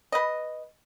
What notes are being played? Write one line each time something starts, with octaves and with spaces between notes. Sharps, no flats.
B4 D#5